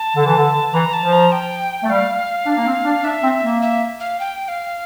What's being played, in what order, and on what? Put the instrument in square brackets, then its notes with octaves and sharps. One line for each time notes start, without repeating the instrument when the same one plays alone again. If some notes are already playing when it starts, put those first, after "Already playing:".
Already playing: [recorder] A5
[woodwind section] D3
E3
D3
[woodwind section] E3 [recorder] A#5
[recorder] A5
[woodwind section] F3
[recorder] A#5
G5
[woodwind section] A3
[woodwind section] G3 [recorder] F5
[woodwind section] D4
A#3
C4
D4
[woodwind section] D4 [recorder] E5
[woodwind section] C4
A#3
[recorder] E5
F5
G5
F5